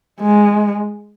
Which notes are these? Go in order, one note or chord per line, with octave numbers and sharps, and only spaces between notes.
G#3